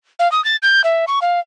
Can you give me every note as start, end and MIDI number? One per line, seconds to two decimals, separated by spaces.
0.19 0.30 77
0.32 0.43 87
0.45 0.56 93
0.62 0.82 91
0.84 1.05 76
1.08 1.19 85
1.22 1.40 77